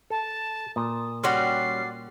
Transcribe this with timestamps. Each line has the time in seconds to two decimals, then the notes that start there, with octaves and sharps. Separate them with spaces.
0.10 A4 A5
0.76 A#2 D#6
1.24 G3 C#4 F#4 D5 F#5 C6 C7